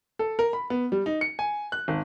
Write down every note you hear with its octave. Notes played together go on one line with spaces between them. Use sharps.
A4
A#4
B5
B3
G3
D#4
C#7
G#5
F#6
G#1